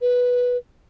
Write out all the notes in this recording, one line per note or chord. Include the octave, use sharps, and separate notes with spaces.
B4